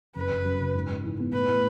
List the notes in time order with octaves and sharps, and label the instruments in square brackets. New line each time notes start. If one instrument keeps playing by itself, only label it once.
[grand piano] F#1 [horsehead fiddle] B4
[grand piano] F#1
F#2
C#3
G#2
G#2
E3
B3
[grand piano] A2 [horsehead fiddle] B4
[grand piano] A2